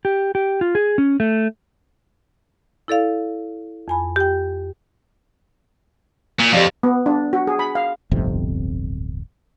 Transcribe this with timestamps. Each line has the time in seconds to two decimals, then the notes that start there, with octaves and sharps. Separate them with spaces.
0.05 G4
0.35 G4
0.61 F4
0.75 G#4
0.98 C#4
1.20 A3
2.88 E4 A4 D5 F5
3.88 F2 G#5 B5
4.16 G4 G5
6.39 A#2
6.53 F2 G4 D5 F5
6.83 B3
7.06 D4
7.33 F#4
7.47 G#4
7.59 B5
7.75 F5
8.11 D1 G1 F2 C3